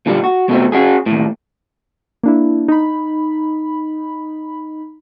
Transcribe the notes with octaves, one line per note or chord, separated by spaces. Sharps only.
A#2 D3 G3
F#4
B2 A3 C4
C#4 D4 F#4 G#4
D#2 A2
A#3 D4 E4
D#4 B5